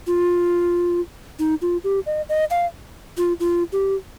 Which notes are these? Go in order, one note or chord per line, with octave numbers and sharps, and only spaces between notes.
F4
D#4
F4
G4
D#5
D#5
F5
F4
F4
G4